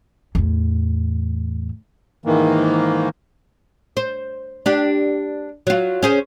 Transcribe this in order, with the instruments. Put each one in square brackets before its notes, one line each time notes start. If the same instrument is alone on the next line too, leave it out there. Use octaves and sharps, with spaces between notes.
[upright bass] E2 A2
[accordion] G#2 D#3 E3 A#3
[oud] C5
D4 G4
F#3 F4
C#4 G#4 C5